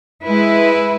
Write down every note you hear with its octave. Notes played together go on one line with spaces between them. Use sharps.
G#3 E4 B4